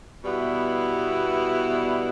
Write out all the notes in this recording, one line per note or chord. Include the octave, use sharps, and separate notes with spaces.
B2 G3 B3 E4